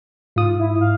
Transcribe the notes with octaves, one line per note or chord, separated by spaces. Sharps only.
G#2 F4 D#6
E4
F5